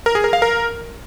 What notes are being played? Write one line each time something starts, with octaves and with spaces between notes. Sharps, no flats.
A#4
G#4
A#4
F5
A#4